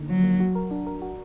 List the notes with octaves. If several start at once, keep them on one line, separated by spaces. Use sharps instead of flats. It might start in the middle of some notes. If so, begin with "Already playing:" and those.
Already playing: D3 A#3 D#4
F3 F#3
A#3
F#4
A#4
D4
A#4
F#4